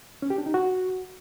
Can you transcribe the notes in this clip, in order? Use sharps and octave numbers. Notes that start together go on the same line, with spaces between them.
C#4
G4
D4
D#4
F#4